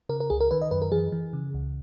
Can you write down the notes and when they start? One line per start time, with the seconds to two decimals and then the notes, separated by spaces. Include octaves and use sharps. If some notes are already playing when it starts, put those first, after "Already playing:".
0.09 C#3 A#4
0.20 A#4
0.30 C#2 G#4
0.40 A#4
0.51 D#3 B4
0.62 D#5
0.71 F#2 B4
0.82 A#4
0.92 E3 G#4
1.12 E3
1.33 C#3
1.54 C#2